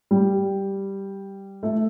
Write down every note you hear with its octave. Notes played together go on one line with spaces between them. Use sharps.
G3
A3